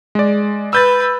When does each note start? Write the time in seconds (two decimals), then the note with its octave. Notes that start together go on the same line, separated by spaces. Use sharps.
0.15 G#3 D5
0.73 B4 E6 G6 A6